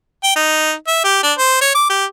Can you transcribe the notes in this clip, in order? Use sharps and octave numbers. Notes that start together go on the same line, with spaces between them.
G5
D#4
E5
G4
D4
C5
C#5
D6
G4